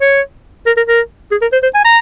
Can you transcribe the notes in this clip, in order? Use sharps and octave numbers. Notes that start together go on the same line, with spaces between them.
C#5
A#4
A#4
A#4
G#4
A#4
C5
C5
G#5
A#5